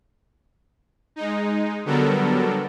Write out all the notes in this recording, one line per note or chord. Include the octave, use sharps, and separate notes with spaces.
G#3 D#4
D3 F#3 G3 B3 A4 A#4